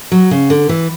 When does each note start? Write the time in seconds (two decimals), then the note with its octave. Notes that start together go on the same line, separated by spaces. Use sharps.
0.12 F#3
0.31 C#3
0.50 D3
0.69 E3